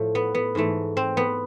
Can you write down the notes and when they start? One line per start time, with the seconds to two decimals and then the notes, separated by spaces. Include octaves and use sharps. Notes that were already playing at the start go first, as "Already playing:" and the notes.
Already playing: A2 F3 A3
0.15 B3
0.35 B3
0.55 G#2 E3 A3
0.97 C4
1.17 B3